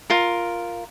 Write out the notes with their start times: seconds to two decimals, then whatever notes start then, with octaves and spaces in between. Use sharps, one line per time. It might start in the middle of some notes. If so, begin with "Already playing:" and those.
0.10 F4 A#4